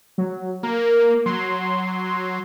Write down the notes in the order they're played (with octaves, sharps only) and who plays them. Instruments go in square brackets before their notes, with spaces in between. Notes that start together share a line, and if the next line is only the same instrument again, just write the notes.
[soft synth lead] F#3
[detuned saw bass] A#3 [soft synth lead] A#4
[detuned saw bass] F#3 [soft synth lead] C6